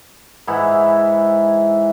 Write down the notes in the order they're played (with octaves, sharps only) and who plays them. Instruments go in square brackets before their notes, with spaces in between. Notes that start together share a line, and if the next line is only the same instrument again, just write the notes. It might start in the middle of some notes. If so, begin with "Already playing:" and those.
[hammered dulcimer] G#2 E3 E4 F#5